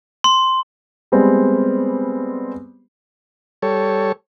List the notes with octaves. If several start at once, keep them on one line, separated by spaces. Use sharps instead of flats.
C6
G3 G#3 B3 C4
G3 A4 C#5